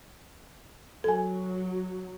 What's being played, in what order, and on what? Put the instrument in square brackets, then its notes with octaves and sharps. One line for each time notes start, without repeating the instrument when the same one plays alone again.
[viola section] F#3 [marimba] A4 G#5